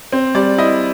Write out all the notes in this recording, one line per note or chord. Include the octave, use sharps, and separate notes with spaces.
C4
G3 D5
E4 D#5